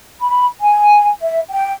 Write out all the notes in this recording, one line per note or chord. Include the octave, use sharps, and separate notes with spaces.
B5
G#5
E5
G5